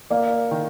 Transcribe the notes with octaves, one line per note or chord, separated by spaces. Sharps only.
A#3 D5 F5
D#3